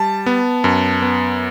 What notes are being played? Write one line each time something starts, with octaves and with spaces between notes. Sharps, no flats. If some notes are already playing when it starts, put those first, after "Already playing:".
Already playing: G3 A5
B3
F#2
B3